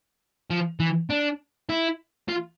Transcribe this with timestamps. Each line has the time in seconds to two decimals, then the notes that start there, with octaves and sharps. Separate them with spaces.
0.50 F3
0.80 E3
1.10 D4
1.69 E4
2.28 F4